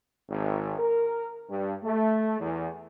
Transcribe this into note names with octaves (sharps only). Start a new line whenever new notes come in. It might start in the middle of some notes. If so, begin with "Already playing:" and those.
G#1
A#4
G2
A3
E2